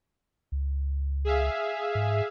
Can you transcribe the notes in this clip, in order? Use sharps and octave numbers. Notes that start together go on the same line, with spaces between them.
C#2
G#4 E5 F5
G#2